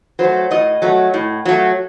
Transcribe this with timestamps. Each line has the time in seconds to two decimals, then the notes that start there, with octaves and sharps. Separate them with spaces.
0.19 F#3 A3 C5
0.51 A2 D#5
0.82 F#3 A3
1.14 A2
1.45 F#3 A3